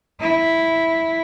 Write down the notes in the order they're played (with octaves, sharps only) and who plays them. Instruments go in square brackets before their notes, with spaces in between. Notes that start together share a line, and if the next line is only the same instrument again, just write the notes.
[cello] E4